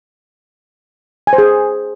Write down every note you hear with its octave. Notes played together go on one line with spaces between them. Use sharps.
G#5
C5
G#4